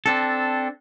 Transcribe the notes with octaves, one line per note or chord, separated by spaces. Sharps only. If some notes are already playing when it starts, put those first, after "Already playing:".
C4 D4 A4